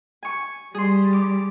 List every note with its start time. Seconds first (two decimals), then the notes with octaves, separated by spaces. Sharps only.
0.23 G#5 C#6
0.75 G3 G#4 C6
1.13 D6